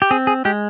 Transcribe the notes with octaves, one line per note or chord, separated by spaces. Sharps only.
G4
C4 G#4
G#4
G#3 G4